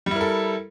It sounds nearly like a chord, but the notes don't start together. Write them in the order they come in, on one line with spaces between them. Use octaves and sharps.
G3 E4 A#4 A4